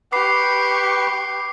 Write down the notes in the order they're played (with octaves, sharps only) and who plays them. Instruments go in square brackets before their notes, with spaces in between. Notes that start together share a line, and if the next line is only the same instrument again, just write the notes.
[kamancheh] G4 C#6 [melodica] B4 [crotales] D6 C7